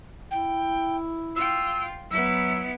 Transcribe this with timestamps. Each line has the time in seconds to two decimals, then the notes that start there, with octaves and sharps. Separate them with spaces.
0.31 E4 G5
1.36 F4 G5 E6
2.10 F#3 B3 E4 E6